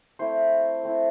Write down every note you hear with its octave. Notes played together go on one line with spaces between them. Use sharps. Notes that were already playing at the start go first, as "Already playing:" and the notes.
A3 C4 E4 C5
A3 C4 E4